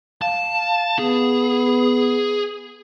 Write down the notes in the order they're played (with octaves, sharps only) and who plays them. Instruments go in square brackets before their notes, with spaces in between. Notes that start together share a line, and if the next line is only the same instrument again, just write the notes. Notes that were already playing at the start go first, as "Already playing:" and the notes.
[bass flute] F5 [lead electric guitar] A5
[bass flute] B3 [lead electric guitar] G#4